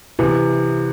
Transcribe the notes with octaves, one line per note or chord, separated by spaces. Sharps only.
C3 E3 B3